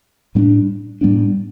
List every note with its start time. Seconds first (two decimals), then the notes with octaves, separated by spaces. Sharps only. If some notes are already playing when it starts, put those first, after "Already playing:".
0.35 A2 G3 B3 D4
1.01 A2 G3 B3 D4